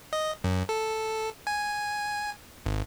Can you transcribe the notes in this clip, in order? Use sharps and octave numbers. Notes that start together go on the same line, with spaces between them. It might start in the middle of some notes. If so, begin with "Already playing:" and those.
D#5
F#2
A4
G#5
G#1